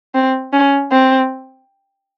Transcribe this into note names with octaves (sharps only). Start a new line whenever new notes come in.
C4
C#4
C4